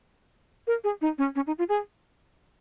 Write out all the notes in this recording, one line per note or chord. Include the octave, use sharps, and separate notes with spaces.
A#4
G#4
D#4
C#4
C#4
D#4
F4
G#4